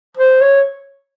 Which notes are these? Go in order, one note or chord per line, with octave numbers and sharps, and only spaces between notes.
C5
C#5